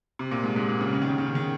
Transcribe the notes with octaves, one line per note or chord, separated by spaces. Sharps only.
C3
A#2
G#2
G#2
A#2
C#3
C#3
D#3
C#3
D#3
C#3
D#3